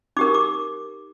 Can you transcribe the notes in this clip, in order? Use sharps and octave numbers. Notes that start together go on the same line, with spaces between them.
D#4 G4 A#4 D6
D6